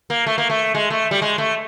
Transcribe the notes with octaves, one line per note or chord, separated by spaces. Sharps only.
A#3
A3
A#3
A3
G#3
A3
G3
G#3
A3